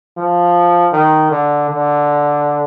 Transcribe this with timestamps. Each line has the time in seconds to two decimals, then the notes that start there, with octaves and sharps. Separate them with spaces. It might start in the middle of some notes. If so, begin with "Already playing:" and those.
0.17 F3
0.92 D#3
1.31 D3
1.69 D3